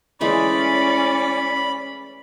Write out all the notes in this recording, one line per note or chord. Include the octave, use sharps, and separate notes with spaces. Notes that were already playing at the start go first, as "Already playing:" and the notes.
E3 G#3 A3 C#4 D5 B5